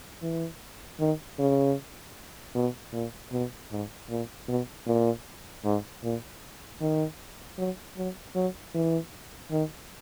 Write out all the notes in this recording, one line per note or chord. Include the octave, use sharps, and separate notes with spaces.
E3
D#3
C#3
B2
A#2
B2
G#2
A#2
B2
A#2
G#2
A#2
D#3
F#3
F#3
F#3
E3
D#3